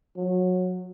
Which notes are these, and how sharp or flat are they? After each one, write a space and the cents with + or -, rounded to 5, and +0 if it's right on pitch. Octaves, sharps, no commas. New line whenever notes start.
F#3 -20